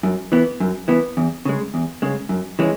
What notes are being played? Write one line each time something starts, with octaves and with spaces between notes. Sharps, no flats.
F#2
E3 B3
F#2
E3 B3
E2
C#3 G#3
E2
C#3 G#3
F#2
E3 G#3 C#4